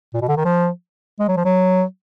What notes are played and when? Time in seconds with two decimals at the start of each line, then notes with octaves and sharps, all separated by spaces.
0.14 A#2
0.22 B2
0.29 D3
0.37 D#3
0.45 F3
1.20 G#3
1.29 F#3
1.37 F3
1.45 F#3